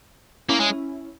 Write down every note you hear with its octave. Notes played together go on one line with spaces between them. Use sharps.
A#3 C#4 E4
G#3